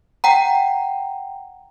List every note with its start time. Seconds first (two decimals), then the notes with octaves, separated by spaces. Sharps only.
0.24 F#5 G5 A#5